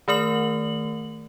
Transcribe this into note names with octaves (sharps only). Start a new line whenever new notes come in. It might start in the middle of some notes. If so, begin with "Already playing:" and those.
D#3 A3 A#4 F#7